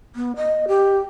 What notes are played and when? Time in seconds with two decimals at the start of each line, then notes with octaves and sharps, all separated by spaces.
0.16 B3
0.36 D#5
0.68 G4